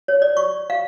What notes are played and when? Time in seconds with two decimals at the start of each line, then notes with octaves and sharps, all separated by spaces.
0.08 C#5
0.22 D5
0.37 C#6
0.70 F5